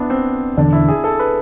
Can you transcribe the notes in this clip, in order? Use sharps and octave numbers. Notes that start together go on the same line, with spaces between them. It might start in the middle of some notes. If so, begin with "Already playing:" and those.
Already playing: B3 D4 E4
C4
E1 E2 D3 D4
E4
G#4
A4
B4